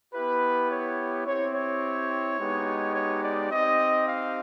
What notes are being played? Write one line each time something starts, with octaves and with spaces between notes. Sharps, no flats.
B3 E4 G4 B4
C#5
C4 E4 G4 C#5
C#5
G#3 B3 D#4 G4
C#5
D5
C4 D#4 G4 D#5
F5